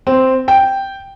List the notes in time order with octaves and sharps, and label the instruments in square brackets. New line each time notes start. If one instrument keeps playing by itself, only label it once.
[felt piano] C4
G5